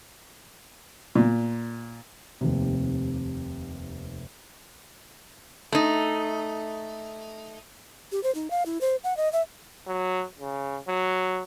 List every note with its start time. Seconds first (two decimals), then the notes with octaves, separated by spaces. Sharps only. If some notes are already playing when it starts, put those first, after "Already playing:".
1.15 A#2
2.41 F1 D#2 C3
5.72 A3 D#4
8.12 G4
8.23 C5
8.35 D#4
8.51 F5
8.66 E4
8.81 C5
9.04 F#5
9.17 D#5
9.33 E5
9.87 F#3
10.39 C#3
10.88 F#3